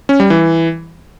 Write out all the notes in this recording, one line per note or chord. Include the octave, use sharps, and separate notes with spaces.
C#4
G3
E3